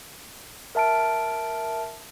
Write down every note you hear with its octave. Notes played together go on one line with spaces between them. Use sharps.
A#4 E5 A5 F6 D7